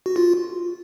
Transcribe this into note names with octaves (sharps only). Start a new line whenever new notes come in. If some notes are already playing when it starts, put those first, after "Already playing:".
F#4
F4